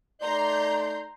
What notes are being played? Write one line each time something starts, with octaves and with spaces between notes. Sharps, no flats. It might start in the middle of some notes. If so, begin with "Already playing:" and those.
A3 D#4 D5 A#5 C6 G6